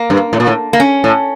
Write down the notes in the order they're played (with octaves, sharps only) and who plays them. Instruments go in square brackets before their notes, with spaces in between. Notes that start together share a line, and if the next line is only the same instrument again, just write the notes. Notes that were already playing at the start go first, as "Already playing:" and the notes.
Already playing: [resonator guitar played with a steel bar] A#3
[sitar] G2
A2
A#2
A2
[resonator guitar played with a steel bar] A#3
C#4
[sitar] A2